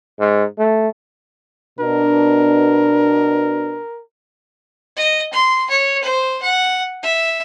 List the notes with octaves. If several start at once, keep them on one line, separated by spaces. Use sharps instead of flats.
G#2
A3
B2 D4 A#4
D#5
C6
C#5
C5
F#5
E5